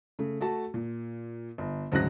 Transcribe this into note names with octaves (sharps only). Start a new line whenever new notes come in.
C#3 A3
A3 F#4 A5
A#2
G1
D2 G#2 C#3 F#3 F#6 A#6